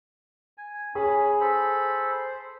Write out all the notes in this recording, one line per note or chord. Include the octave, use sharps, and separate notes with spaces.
G#5
C#4 G#4 B5
A4 C5 B5